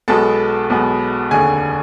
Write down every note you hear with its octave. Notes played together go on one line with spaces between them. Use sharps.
B1 B2 G#3 B3 A4 A5
B1 B2 G#3 B3
F1 D#2 D3 G#4 G#5